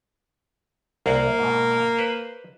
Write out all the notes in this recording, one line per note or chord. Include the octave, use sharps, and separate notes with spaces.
C2 A#3 F#5
G#2 B2
B4 C5